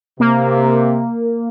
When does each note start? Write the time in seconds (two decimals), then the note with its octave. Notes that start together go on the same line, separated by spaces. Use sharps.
0.20 C3 A#3